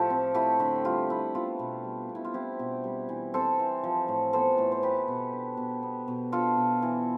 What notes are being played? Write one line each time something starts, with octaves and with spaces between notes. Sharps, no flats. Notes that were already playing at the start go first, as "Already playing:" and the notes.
Already playing: A2 F3 A3 F4 G4 A4
C4
A3 E4 G4
D3
G3 F4
D4 E4
B3 F4
B2
G3
B2
E4
F4
C4 E4 G4
B2
G3
E3
C4 A4 C5
E3
F3
A2
B3 A4 C5
A2
C5
B3 G4 B4
B2
D4
B2
B3
B2
D4 F4 A4
B2
E3